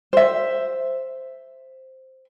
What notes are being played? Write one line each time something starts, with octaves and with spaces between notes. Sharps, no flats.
C5 E5